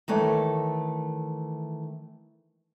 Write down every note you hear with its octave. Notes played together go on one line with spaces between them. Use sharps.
D#3 E3 A3 C#5